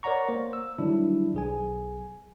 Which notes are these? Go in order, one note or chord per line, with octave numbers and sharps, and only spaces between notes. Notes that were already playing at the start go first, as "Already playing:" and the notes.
A#4 C#5 D5 F#5 A#5 C#6
A#3 C5
E6
D3 D#3 F#3 G3 D4 E4
B1 G#4 G#5